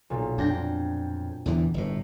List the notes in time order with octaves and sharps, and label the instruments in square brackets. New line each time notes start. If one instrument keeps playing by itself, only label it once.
[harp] B1 A#2
[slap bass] F2 [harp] D4 G5 A#6
[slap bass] E2 D3 E3
G1 A2